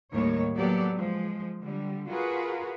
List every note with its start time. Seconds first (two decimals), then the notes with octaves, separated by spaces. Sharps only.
0.12 D#2 A2 D#3 G3 C#5
0.56 F#3 A#3 B3 G4 A4 D5
0.93 F3 G#3
1.60 D3 G3
2.07 F4 F#4 G#4 A#4 B4